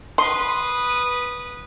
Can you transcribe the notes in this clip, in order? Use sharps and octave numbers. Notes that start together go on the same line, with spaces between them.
B4 C6 D#6